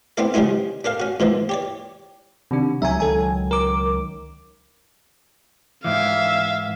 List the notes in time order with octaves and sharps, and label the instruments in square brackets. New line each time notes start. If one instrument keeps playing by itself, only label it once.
[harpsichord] B3 C4 D4 E4 A4
C#3 F3 G3 G#3 D#4 E4
D4 A4 A#4 F5
C#4 F#4
G#2 E3 F3 A#3
G4 C#5 D5
[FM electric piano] C3 D#3 D4
[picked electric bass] C#2 D#3 F#3 [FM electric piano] E5 G#5
[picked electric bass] C#2 D#3 F#3 [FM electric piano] A4 G#5
[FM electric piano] A#4 D6
[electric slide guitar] G#2 E3 [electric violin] E5 F5